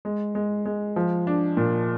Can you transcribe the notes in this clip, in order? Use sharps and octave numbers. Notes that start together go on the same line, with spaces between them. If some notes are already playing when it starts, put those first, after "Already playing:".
G#3
G#3
G#3
F3
D4
A#2